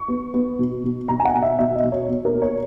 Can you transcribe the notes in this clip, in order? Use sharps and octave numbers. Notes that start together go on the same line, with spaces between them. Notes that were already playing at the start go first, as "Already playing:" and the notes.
Already playing: C#6
B3
B3
B2
B2
B2 A#5
G#5
F#5
B2
E5
B2 E5
D#5
B2
C#5
B2
A#4
A#3
C#5